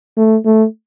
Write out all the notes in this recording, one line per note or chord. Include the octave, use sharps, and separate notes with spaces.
A3
A3